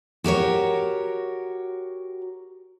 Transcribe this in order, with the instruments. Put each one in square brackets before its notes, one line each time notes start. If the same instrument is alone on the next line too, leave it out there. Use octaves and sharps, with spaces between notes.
[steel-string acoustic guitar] F#4 G4 A#4 C#5